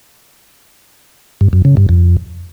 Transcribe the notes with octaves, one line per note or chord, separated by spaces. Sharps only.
G2
F#2
C#3
G2
F2